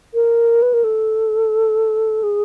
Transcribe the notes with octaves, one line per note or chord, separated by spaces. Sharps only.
A#4
B4
A#4
A4
G#4